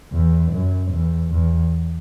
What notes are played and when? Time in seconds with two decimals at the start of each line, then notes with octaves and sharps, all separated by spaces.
0.12 E2
0.51 F#2
0.90 E2
1.30 E2